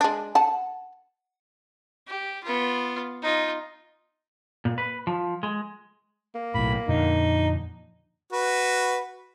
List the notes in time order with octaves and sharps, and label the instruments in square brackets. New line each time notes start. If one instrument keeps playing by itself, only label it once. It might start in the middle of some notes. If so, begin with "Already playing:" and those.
[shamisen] G#3 D4
F#5 A5
[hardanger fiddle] G4
B3 F4
D#4 F4
[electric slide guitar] A#2
B4
F3
G#3
[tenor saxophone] A#3
[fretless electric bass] B1 A2 [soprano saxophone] B5
[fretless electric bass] F2 A#2 D3 [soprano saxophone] D#4
[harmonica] F#4 B4